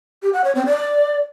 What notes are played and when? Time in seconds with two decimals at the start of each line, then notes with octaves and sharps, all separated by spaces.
0.23 G4
0.33 F#5
0.44 C#5
0.55 C4
0.66 D5